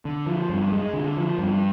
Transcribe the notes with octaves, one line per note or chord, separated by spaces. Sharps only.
D3
F3
G2
G#3
D3
F3
G2